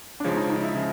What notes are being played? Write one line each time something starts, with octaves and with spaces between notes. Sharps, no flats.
D4
C#3 F3 G#3 C#4
D#4
D#4
E4
C#3 F3